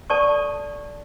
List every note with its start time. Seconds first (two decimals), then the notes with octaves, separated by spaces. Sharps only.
0.10 A4 D5 A5 C#6